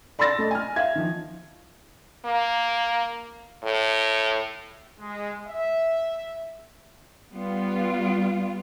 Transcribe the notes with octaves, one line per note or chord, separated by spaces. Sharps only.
D5 B5 C6 E6 A6 A#6
A3 D#5
G#5 F6
E5 F5 G#6
D#3 F3
A#3
A2
G#3
E5
G3 B3 F4